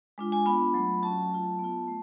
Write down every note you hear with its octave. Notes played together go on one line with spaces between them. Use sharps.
G#3 D4 F4
G#5
B3 D4 F4 B5
F#3 A3 F4
F#3 C#4 F#4 A5
F#3 A3 F4
B3 F4
A3